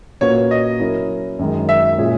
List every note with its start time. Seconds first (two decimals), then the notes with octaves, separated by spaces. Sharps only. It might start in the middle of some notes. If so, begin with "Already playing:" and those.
0.21 A#2 A#3 C#4 F#4 B4 C#5
0.51 D#5
0.80 F#3 C#4 E4 A#4
1.39 F#2 D#3 G#3 D#4
1.69 E5
1.98 A#2 G#3 C#4 G#4